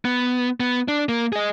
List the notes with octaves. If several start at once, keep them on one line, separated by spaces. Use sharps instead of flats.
B3
B3
D4
A#3
G#4 D#5